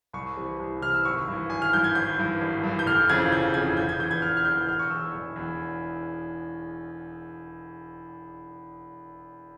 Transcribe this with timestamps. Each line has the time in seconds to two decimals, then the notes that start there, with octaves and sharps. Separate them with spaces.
0.13 C2 C#6
0.37 C3 E3
0.59 C2
0.82 C3 E3 F6
0.94 E6
1.05 G#1 C#6
1.28 G2 E3
1.50 G#1 G#5
1.62 F6
1.73 G2 E3 G6
1.84 G#6
1.95 G#1 G6
2.19 G2 E3
2.41 G#1
2.63 G2 E3
2.79 G6
2.86 F1 F6
3.09 F2 C#3 E3 G#6
3.32 F1 G6
3.54 F2 C#3 E3 G#6
3.77 E1 G6
3.89 G#6
4.00 E2 E3 G6
4.11 G#6
4.22 E1 F6
4.37 F6
4.45 E2 E3 G6
4.67 E1 F6
4.79 C#6
4.90 E2 E3 E6
5.13 E1
5.36 E2 E3